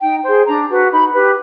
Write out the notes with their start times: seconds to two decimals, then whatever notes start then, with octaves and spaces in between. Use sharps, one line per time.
0.01 D#4 G5
0.23 G#4 C5
0.46 D4 A#5
0.69 F#4 B4
0.91 D#4 B5
1.14 G4 B4